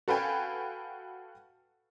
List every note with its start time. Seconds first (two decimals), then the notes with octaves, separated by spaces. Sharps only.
0.08 F#4 A4 B4 F5 G5 G#5